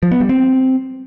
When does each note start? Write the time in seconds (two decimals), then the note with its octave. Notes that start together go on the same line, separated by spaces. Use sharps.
0.03 F3
0.12 B3
0.20 G3
0.29 C4